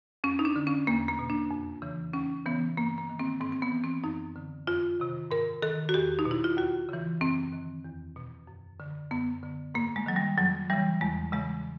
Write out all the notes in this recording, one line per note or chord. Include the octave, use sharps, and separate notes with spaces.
F2 C#4
D#4
D4
D3
C#4
E2 A#3
A#3
B2
D4
F2
C#3 E3
D#2 C#4
C#3 E3 B3
G2 A#3
A#3
D#3
C4
G#2 C4
C4
B3
E3
C4
F#2 D#4
D3
F2 F4
C3 D#3
G#2 A#4
D#3 A4
F#4
E2 G4
D#4
B2
E4
F4
D#2 F#4
C#3 E3
F#2 C4
D#3
E2
B2
F#2
D3
F#2 B3
D3
G#2 A#3
G#3
D#3 F#3
G3
F2 F#3
C#3 E3 G3
E2 G#3
C#3 E3 G#3